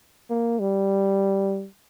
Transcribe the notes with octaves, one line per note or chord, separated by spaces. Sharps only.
A#3
G3